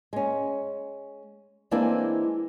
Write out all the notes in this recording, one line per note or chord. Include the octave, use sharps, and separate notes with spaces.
G#3 C#4
E3 G#3 A#3 C4 D4 E4